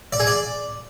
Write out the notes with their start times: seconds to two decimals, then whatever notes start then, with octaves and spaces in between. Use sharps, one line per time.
0.13 D5
0.20 G#4
0.27 D5